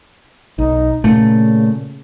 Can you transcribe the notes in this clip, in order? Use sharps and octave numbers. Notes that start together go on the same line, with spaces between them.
B1 D#4
A#2 C#3 A3